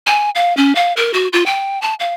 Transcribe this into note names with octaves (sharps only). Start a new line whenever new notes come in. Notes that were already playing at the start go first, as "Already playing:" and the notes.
G#5
F5
C#4
F5
A#4
F#4
F4
G5
A5
F5